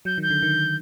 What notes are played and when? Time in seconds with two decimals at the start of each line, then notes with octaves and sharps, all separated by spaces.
0.05 F#3 G6
0.18 D#3 G6
0.30 D3
0.42 D#3